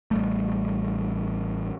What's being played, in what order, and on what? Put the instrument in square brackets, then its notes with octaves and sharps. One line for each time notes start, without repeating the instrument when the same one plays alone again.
[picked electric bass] A1 G3 A3